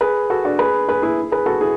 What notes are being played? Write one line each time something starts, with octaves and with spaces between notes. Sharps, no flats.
G#4 B4
F#4 A4
D4 F#4
G#4 B4
G#4 B4
E4 G#4
G#4 B4
F#4 A4
E4 G#4